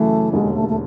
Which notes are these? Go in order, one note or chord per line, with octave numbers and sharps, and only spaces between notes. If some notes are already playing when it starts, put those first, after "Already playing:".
Already playing: F#2 C#3 E3 A3
E1 D#2 D3 G#3
A3
A3